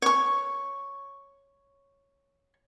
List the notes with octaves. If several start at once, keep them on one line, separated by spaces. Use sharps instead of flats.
C#5 C#6